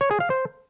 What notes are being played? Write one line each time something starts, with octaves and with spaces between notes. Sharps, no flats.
C#5
G#4
F5
C5